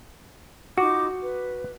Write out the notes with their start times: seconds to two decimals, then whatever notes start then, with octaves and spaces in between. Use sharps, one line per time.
0.78 D#4 F4 F#4 D6
1.22 B4